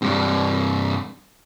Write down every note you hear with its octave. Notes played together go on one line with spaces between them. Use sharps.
G2 C3